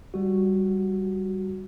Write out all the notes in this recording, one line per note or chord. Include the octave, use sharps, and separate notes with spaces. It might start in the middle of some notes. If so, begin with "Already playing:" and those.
G3 F#4